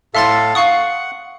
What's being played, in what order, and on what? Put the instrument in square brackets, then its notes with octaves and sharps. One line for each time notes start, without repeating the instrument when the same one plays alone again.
[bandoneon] A2 A4 F5 [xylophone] E5 C6 A6
[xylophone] F5 C#6 D#6 [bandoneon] F#5